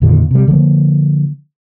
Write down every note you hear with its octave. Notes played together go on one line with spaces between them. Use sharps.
F2 A#2 D3 D#3
C3 G3
D3 F3 G#3 A#3